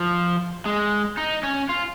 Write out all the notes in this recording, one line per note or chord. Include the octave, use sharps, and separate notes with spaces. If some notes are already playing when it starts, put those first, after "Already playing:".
Already playing: F3
G#3
D#4
C#4
F4